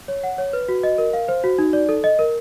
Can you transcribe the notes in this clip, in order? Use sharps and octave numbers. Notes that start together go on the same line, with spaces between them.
C#5
F#5
C#5
B4
F#4
D#5
A#4
F5
C5
F#4
D#4
D5
A4
D#5
A#4